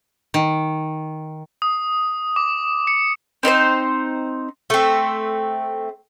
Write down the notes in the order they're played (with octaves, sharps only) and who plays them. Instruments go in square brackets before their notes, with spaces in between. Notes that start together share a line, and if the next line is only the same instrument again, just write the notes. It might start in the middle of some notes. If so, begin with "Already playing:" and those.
[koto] D#3
[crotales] D#6
D6
C#7
[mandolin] C4 D#4 A#4 C5
[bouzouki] A3 C4